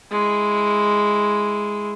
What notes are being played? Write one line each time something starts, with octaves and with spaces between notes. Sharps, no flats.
G#3 E4